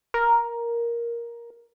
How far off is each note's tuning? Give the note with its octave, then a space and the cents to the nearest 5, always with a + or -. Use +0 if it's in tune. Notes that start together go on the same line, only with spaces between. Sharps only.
A#4 +10